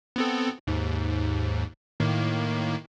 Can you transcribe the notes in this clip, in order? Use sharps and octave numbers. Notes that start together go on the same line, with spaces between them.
B3 C4 A4
D#2 G#2
A2 D#3 A#3